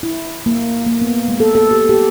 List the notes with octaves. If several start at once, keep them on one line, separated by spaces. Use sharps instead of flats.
E4
A#3
A#3
B3
G#3
A4
A4
G4
G4